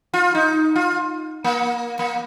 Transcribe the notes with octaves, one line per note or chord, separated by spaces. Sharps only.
F4
D#4
F4
A#3
A#3